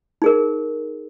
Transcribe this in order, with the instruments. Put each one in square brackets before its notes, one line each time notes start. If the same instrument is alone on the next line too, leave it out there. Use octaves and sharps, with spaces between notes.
[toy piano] D#4 G#4 A#4